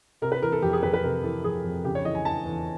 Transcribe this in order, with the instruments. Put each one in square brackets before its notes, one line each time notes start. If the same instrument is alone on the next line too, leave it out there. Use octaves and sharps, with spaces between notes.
[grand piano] C3 A#4
B4
E3 A#4
A4
F2 G4
G#4
F2 B4
B4
C3 A#4
E3 A4
F2 G#4
F2
C#3 G4
C#5
E3 D#5
G#5
E2 A5
E2